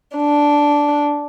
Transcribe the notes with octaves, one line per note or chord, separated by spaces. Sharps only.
D4